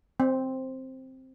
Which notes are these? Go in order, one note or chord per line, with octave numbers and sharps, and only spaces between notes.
C4